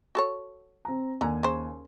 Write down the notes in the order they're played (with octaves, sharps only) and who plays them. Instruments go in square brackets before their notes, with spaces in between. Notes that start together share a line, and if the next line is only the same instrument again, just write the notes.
[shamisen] F#4 A4 C#5
[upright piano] C4 A#5
[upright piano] D#2 G#5 [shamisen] D3 A#5
[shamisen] C#3 C5